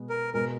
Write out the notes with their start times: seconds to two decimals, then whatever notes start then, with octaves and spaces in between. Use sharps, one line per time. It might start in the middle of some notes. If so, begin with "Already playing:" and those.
Already playing: B2 G#3 B3
0.10 A#4
0.34 B2 G#3 A#4